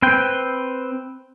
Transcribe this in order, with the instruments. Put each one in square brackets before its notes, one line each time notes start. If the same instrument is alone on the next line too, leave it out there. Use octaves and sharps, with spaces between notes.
[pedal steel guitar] C4 B4 G5